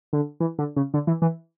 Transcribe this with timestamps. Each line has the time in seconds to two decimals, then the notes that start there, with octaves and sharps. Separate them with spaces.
0.13 D3
0.40 E3
0.59 D3
0.76 C#3
0.94 D3
1.07 E3
1.22 E3